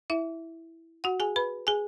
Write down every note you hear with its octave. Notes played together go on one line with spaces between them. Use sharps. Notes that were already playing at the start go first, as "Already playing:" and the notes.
E4 E5
F#4 F#5
G#4 G#5
B4 B5
G#4 G#5